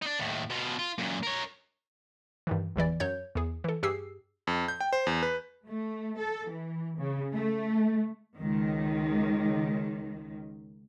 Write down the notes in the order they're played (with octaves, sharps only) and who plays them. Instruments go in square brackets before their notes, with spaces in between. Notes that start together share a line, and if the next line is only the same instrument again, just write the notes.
[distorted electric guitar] D4 D#4
D#2 A2
B2 F4
F4
F#2 A#2
A#4 C#5
[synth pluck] G2 D#3 E3
G1 E2 E3 D5
F#2 C#5 G6
E2 G#4
E3 A4
G2 G4 G#4 E6 C7
[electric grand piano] F2
G6
G5
C5
E2
B4
[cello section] A3
A4
E3
C#3
A3
[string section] C#2 D#3